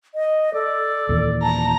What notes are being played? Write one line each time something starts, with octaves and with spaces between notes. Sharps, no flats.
D#5
A4 D5
D#2 A#2 E3
A5 A#5